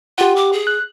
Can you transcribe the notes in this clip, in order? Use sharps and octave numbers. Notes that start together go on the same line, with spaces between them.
F4 G4 F#5
D6
G#4
F#6